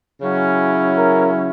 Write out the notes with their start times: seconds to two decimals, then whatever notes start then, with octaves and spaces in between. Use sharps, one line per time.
0.21 C#3 F#3 C#4 E4
0.95 A#4